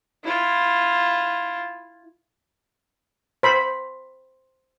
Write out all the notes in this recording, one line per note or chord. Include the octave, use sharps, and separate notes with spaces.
E4 F4
C5 B5